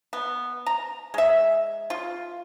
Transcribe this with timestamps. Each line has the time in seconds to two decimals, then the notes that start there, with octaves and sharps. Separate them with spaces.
0.13 B3
0.66 A#5
1.14 G#3 E5
1.90 F4